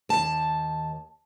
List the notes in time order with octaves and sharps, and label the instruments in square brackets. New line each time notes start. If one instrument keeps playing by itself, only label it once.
[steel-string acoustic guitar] D#2 A5